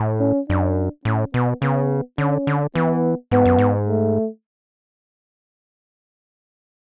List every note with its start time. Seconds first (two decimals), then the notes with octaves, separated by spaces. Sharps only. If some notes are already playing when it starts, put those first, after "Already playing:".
Already playing: A2
0.20 C#4
0.49 F#2 D4
1.05 A2 C#4
1.34 B2 B3
1.62 C#3 B3
2.18 D3 C#4
2.47 D3
2.75 E3 B3
3.31 G#2 B3
3.45 F#2
3.59 G#2
3.88 A3